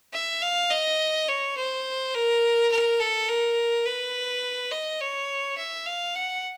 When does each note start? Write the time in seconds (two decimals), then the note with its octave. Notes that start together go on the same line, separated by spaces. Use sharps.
0.13 E5
0.42 F5
0.71 D#5
1.29 C#5
1.57 C5
2.14 A#4
2.72 A#4
3.00 A4
3.29 A#4
3.86 B4
4.71 D#5
5.01 C#5
5.58 E5
5.86 F5
6.15 F#5